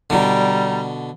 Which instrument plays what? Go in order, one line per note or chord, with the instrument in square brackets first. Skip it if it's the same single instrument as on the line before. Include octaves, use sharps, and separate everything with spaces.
[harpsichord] B2 D3 [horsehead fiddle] G3 A#5